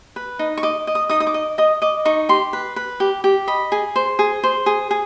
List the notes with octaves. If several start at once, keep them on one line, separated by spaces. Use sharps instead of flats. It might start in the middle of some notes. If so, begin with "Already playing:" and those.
B4
D#4
C#6
D#5 D6
D#5
D#6
D#4 D#6
D#6
D6
D#5
D#5 D#6
D#5 D6
D#4 C#6
G4 C6
B4
B4
G4
G4
D#5 B5
G#4
C5
G#4
C5
G#4
G#4